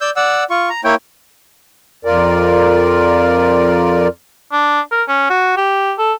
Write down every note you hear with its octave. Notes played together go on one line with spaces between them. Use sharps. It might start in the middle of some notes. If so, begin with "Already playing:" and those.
D5 E6 G6
D5 F#5 E6
F4 C#6
A#5
A#3 E4 C#5 G5
F2 F4 A#4 D5
D4
A#4
C#4
F#4
G4
A4